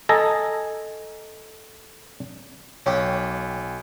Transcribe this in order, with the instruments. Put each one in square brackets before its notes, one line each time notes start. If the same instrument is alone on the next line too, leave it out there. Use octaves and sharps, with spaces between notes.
[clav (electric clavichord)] A4 D#5 G#5 A#5
[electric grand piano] B1 [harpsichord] C#4 G4